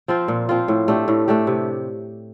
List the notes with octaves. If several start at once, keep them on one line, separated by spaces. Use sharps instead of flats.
F3 C4 F4
A#2
F3 C4 F4
A2
A3 D4 G4
A2
A3 D4 G4
C3